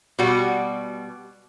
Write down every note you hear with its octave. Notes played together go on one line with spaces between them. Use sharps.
B2 G3 F#4